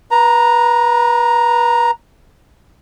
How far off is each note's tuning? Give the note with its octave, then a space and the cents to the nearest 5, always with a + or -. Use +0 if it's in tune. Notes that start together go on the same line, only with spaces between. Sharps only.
B4 -25 A#5 +0